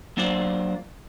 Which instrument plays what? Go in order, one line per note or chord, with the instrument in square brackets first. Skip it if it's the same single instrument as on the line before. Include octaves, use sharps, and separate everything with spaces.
[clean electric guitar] F#3 A#3 D4 F4 C5 D5